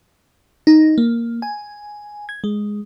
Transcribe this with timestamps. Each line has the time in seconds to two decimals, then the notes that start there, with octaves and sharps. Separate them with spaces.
0.67 D#4
0.98 A#3
1.42 G#5
2.29 G#6
2.44 G#3